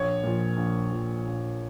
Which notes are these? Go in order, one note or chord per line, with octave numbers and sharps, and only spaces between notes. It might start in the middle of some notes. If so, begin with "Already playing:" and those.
Already playing: A#1 C#5
A#2 F3
A#1
A#2 F3
A#1